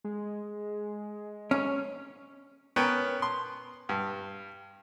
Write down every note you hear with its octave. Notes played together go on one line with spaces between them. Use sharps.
G#3
C#4
B3 C#4 A#4 C#5 G5
C6
G2